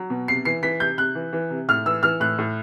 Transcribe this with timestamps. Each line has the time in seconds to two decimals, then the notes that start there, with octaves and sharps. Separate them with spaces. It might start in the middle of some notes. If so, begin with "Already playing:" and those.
Already playing: F#3
0.10 B2
0.28 C3 C7
0.45 E3 C7
0.63 E3 B6
0.80 C3 G6
0.97 C3 F#6
1.15 E3
1.33 E3
1.50 C3
1.69 A2 F6
1.86 E3 E6
2.03 E3 F6
2.20 A2 F#6
2.38 A2